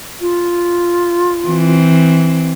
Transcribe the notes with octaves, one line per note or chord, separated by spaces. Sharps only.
F4
E3 C4